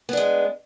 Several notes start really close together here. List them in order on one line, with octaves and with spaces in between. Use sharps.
B3 D4 G#3